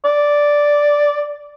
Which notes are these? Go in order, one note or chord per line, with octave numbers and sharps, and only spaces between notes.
D5